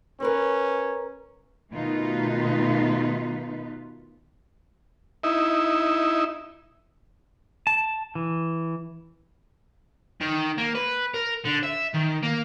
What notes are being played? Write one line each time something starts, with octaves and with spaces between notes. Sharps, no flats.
C#4 A#4 B4 C#5
B2 D#3 A3 D#4 F4 B4
D#4 E4
A5
E3
D#3
A#3
B4
A#4
D3
E5
D#3
A#3